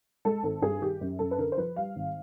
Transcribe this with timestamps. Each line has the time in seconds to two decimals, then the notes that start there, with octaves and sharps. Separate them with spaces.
0.25 G#3 A4
0.43 G#1 A4
0.62 G2 G#4
0.81 D#3 G4
1.01 F#2
1.19 F#2 A4
1.31 B4
1.38 D3 A#4
1.52 C5
1.57 F3 B4
1.76 G3 F5
1.95 G#1